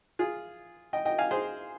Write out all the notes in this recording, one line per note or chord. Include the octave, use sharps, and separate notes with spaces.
F4 G#4
D#5 G5
D#5 G5
F5 G#5
G#4 C5